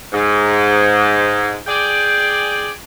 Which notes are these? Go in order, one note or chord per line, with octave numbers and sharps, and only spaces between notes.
G#2
G#4 D5 G5